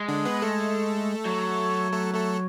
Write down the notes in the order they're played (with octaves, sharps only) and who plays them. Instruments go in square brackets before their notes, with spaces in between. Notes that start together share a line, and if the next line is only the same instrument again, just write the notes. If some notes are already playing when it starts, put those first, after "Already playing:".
Already playing: [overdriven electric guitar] G#3
[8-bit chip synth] D3 D4
B3 B4
A3 A4
[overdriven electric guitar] F#3
[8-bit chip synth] A3 A4
A3 A4